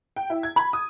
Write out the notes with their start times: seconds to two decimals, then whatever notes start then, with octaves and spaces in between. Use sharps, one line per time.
0.16 G5
0.30 E4
0.43 G#6
0.56 B5
0.73 D#6